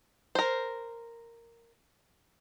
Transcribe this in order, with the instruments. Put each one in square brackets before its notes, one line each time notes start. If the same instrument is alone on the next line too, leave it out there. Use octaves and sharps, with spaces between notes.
[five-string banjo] A#4 C5